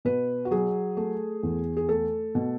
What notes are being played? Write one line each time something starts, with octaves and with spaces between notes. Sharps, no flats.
B2 B4
F#4
F#3 G#4
A3
E2
G#4
A3 A4
B2